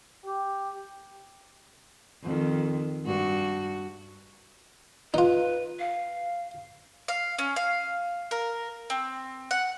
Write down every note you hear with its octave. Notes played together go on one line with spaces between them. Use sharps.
G4
F2 D#3
G2 F#4
D#4 F4 B4
F5
F5
C#4
F5
A#4
C4
F#5